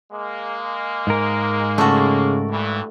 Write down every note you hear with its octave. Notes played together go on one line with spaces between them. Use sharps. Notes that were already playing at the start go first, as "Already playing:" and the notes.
G#3 A#3
G#2 A#4
C#3 A3 F#4
G2 E3